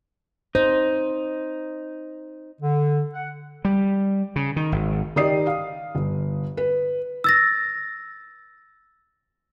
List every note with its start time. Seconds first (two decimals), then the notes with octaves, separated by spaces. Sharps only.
0.55 D#4 C5
2.61 D3
3.13 F#5
3.65 G3
4.36 C#3
4.56 D#3
4.72 G#1
5.16 D#3 D#4 G4 D5 D#6 C7
5.47 F5
5.95 G1
6.57 B4
7.24 E6 A6 A#6